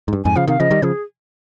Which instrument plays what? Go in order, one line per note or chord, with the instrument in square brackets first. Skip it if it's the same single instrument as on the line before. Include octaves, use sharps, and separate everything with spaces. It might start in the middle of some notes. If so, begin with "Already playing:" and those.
[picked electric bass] G#2
G2
[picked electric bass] F2 G#2 [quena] G#5
[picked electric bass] C#3 F3 [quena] F5
[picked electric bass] C3 D#3 [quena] F5
[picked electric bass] C#3 F3 [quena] D#5
[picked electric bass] D#3 G3
[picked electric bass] C#3 F3 [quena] G#4